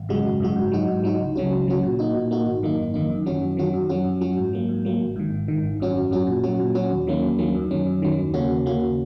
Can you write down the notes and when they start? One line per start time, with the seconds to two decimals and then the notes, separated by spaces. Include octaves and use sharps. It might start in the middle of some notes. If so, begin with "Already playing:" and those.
Already playing: G#1
0.09 F#2 C#3 G#3 F#4
0.24 G#1
0.40 F#2 C#3 G#3 F#4
0.56 G#2
0.72 F#3 D#4 F#4
0.88 G#2
1.04 F#3 D#4 F#4
1.20 C#2
1.36 C#3 F#3 C#4 F#4
1.52 C#2
1.67 C#3 F#3 C#4 F#4
1.83 A#2
1.99 A#3 D#4 F#4
2.15 A#2
2.31 A#3 D#4 F#4
2.46 G#1
2.63 F#2 D#3 A#3 D#4
2.78 G#1
2.94 F#2 D#3 A#3 D#4
3.10 F#2
3.26 D#3 F#3 C#4 F#4
3.42 F#2
3.57 D#3 F#3 C#4 F#4
3.74 F#2
3.89 F#3 C#4 F#4
4.05 F#2
4.21 F#3 C#4 F#4
4.37 G#2
4.53 F#3 A#3
4.69 G#2
4.85 F#3 A#3
5.00 G#1
5.16 G#2 D#3
5.32 G#1
5.48 G#2 D#3
5.64 G#1
5.80 F#2 F#3 C#4 F#4
5.95 G#1
6.11 F#2 F#3 C#4 F#4
6.27 A#2
6.43 F#3 C#4 F#4
6.59 A#2
6.75 F#3 C#4 F#4
6.91 D#2
7.07 D#3 F#3 A#3 C#4
7.23 D#2
7.39 D#3 F#3 A#3 C#4
7.55 F#2
7.71 D#3 F#3 C#4
7.86 F#2
8.02 D#3 F#3 C#4
8.18 D#2
8.34 C#3 A#3 C#4 F#4
8.49 D#2
8.65 C#3 A#3 C#4 F#4